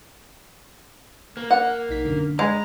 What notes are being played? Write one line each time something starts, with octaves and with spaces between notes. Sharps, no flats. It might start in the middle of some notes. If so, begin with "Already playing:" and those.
A#3
F#5
B1 D#4 B6
F#2 D3
G#3 A#5 B5